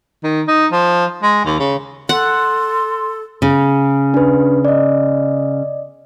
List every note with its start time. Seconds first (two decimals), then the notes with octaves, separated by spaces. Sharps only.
0.24 D#3
0.48 D#4
0.72 F3
1.23 G#3
1.45 D#2
1.60 C#3
2.09 A4 F#5 C6
3.42 C#3
4.14 D4 B4
4.65 D5 D#5